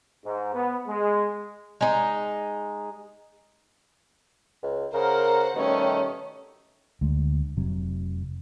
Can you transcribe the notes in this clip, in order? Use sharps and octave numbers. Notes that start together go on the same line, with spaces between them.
G#2
B3
G#3
G#3 D#4
C#2
C#3 A#4 C5 F#5
B2 D#3 G3 A3 C#4
D2 G#3
F1 C3 F#3